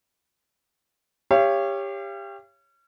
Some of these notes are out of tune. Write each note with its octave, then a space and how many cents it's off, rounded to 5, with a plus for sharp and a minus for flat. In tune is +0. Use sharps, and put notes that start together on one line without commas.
G4 +20 C#5 +0 F5 -40